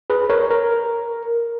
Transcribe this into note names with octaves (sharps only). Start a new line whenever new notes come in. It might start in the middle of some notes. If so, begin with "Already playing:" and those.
G#4 B4
A#4 C#5
A#4